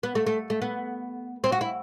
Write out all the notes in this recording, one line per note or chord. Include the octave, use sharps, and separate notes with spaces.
B3
A3
A3
A3
B3
C4
F#4
E4